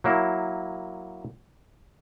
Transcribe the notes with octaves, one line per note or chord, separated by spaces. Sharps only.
F#3 A#3 E4